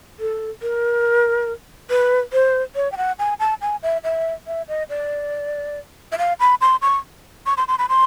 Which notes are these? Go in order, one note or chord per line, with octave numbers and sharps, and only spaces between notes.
A4
A#4
B4
C5
C#5
G5
F#5
G#5
A5
G#5
E5
E5
E5
D#5
D5
E5
F5
B5
C6
C#6
C#6
C6
C6
B5
C6